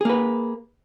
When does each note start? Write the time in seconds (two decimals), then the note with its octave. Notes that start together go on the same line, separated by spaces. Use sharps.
0.01 G#4
0.05 A#3
0.09 B4